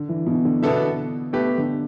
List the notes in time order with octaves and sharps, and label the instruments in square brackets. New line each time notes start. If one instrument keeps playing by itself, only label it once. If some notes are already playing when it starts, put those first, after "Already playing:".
Already playing: [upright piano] D3
E3
B2
D3
[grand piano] B2 B3 D4 A4 E5 [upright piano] D3
[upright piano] B2 [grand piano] A3 G4 B4
[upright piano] D3